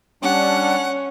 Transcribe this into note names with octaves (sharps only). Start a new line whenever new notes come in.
G3 C#4 D4 F#5